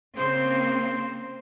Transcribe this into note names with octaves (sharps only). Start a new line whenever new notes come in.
C#3 A#3 C4 C5